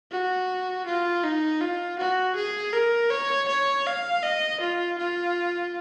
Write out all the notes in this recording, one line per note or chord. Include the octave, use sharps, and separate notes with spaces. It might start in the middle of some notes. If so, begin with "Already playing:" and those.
F#4
F4
D#4
F4
F#4
G#4
A#4
C#5
C#5
F5
D#5
F4
F4